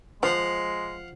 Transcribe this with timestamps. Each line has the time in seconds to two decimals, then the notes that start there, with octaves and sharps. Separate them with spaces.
0.23 F3 G#3 F5 F#5